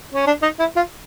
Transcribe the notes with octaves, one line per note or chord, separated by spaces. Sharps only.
C#4
D4
D#4
E4
F4